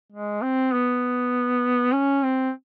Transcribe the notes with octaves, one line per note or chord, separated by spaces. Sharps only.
G#3
C4
B3
C#4
C4